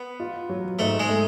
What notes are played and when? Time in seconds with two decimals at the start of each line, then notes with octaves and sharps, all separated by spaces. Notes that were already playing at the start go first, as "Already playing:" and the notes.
Already playing: B3
0.20 F4
0.49 F#3
0.79 G#2 A3
0.99 G#3
1.09 A3